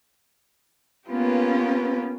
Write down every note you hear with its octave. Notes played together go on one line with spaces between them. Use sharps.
A#3 B3 C#4 F4 G4 B4